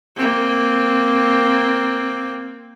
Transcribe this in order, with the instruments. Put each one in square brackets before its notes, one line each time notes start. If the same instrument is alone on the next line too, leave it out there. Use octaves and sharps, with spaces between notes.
[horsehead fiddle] A#3 C4